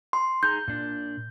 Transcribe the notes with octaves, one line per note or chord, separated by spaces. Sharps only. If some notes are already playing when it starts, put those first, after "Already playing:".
C6
D#4 G#4 A#5 G6
A#2 D4